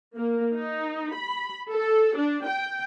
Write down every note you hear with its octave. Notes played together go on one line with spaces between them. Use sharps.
A#3
D#4
B5
A4
D4
G5